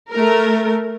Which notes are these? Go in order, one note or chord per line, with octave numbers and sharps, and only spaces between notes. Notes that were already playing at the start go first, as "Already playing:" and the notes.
A3 A#4